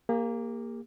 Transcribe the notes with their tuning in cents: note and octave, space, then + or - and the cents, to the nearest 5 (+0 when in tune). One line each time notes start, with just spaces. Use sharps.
A#3 +0 G4 +45